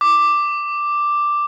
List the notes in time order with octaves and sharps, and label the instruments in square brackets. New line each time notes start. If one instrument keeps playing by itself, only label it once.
[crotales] D6